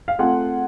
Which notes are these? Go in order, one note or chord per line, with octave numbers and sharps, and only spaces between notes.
F5
A3 C4 F4 G#4 F#5